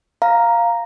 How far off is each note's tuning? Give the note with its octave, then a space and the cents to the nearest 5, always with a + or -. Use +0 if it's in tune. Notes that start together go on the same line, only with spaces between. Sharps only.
F5 +0 A#5 +0